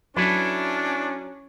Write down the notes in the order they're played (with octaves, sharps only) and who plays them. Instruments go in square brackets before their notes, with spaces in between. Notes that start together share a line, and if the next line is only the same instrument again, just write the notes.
[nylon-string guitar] F#3 [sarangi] C#4 [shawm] D4 [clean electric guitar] E4 A4 B4